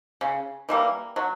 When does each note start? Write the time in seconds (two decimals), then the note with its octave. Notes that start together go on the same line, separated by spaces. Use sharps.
0.21 C#3
0.69 E3 G3 A#3
1.16 F#3